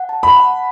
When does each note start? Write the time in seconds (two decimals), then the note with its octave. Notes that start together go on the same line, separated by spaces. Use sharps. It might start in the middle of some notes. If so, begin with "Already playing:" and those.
Already playing: F#5
0.09 A5
0.23 B5
0.36 F#5